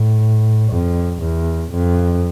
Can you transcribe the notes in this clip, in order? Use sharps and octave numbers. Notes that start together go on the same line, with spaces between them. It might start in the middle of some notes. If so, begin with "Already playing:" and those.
Already playing: A2
F2
E2
F2